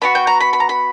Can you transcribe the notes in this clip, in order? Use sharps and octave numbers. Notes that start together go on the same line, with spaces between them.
B3 D4 F#4 B5
G5
A#5
B5
B5
A#5
B5